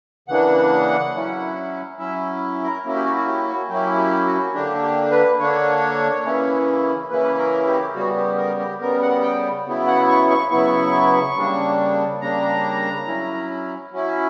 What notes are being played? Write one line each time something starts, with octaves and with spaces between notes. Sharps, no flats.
C#3 E3 A#3 D4 F#5
F#3 C#4 E4
F#3 C#4 E4 E5
A#4
F#3 A#3 C#4 E4
G4
F#4
F#4
G4
F#4
F#3 A#3 C#4 E4 G4
G4
F#4
D3 A#3 D4 G4
G4
B4
D3 A#3 D4 C#5
C#3 E3 A#3 C#4 E4
C#3 E3 A#3 C#4 E4 B4
A#4
G4
C#3 G3 B3 F#4
G4
A#4
G4
C#3 G3 B3 A#4
F#5
G5
C#3 F#3 B3 E4
F#5
C#6
C#6
C#3 F#3 B3 E4 C#6
C#3 G3 A#3 D4
C#3 G3 A#3 D4 A#5
F#3 C#4 E4
F#3 C#4 E4